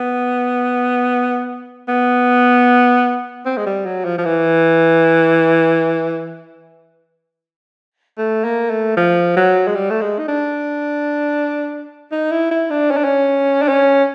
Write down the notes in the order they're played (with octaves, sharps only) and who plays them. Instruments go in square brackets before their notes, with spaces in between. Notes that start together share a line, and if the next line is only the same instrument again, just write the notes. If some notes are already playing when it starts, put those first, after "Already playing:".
Already playing: [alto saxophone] B3
B3
C4
G#3
G3
F#3
F3
F3
E3
A3
A#3
A3
F3
F#3
G#3
G3
A3
G#3
D#4
D4
D#4
E4
E4
D4
C#4
D4
C#4
D4
C#4